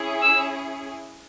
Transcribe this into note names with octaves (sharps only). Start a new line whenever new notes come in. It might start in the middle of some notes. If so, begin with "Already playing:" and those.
Already playing: C#4 E4 G#4
E6